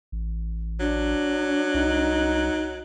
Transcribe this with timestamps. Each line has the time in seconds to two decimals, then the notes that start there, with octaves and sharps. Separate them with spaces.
0.12 A1
0.80 F#3 D4
1.74 C2 D#4